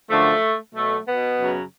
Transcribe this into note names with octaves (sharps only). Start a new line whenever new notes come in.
F#2 D3 F3 A3
B2 F#3 A3
B2 B3
F#2 C#3 F#3